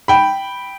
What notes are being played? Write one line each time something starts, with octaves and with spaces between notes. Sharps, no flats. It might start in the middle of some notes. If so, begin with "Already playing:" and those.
G5 B5